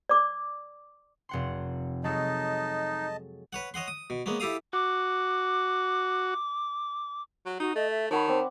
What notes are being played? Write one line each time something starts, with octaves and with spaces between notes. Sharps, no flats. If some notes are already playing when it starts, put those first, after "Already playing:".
D5 D6
F1 F#5 C6
F#3 G#3 D#4 A4 D#5 A5
B4 C#5 F#5
C#5 D#5 F#5 C6
D#6
B2
G#3 A#3 B3 C#4
E4 G4 A4 F5 D#6
F#4 D6
F#3
D#4 F#4
A3 D#5
E5
D#3 C#5 F#5 A5 B5
C4 D5